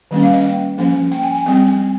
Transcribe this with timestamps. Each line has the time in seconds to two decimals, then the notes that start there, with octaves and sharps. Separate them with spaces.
0.11 D#3 G3 A#3 C#4
0.23 F5
0.33 D#5
0.45 G5
0.78 F3 A#3 C#4
1.11 G5
1.23 G#5
1.35 G#5
1.46 G3 C4 G5